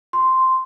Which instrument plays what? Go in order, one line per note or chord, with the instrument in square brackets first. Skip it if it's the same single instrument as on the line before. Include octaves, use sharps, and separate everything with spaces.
[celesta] C6